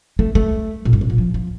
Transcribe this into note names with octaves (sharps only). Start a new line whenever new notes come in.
A3
A3
A#2
G2
A2
A#2
F3
F3